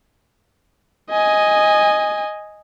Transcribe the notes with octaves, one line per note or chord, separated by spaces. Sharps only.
D#5 G#5